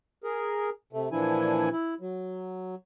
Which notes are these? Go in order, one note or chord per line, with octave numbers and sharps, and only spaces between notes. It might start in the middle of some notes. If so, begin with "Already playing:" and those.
G#4 A#4
C3 A3
A#2 E3 F3 D4 E4 G#5
E4
F#3